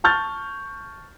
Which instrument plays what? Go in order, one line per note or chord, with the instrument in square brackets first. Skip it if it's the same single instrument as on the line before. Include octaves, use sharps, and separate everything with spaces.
[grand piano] A5 C#6 F6 G6 A6